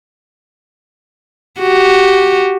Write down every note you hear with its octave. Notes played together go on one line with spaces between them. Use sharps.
F#4 G4